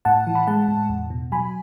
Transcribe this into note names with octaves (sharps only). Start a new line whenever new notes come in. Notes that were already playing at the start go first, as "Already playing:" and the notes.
A2 F#5 A5
E3
B5
G#3 F#5 A5
A2
E2
B2
F#3 G#5 B5